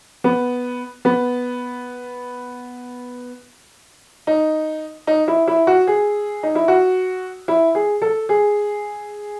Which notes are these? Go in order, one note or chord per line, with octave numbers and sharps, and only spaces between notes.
B3
B3
D#4
D#4
E4
E4
F#4
G#4
D#4
E4
F#4
E4
G#4
A4
G#4